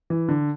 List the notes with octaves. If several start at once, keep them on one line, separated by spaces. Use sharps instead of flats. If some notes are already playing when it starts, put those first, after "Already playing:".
E3
D3